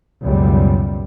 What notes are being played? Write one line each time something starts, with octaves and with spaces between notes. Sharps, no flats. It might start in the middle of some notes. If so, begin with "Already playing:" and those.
C#2 F#2 B2 G3